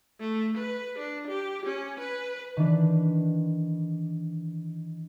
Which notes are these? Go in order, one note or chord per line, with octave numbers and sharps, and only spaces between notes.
A3
B4
D4
G4
C#4
B4
D#3 E3 D4 B4